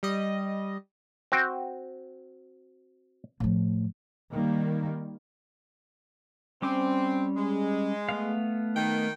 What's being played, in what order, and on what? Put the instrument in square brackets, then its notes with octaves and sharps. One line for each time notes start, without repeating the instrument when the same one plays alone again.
[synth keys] G3 D#5
[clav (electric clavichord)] C4 F#4 G5
[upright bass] A2 F3
[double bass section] D#3 G3 A#3
[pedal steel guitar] G3 C#4 D6 [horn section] C4
[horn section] G#3
[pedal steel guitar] A3 B3 F5
[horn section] D#3 G5